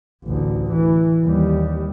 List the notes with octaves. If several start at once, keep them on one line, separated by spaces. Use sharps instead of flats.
A1 D2
E3
D#2 G3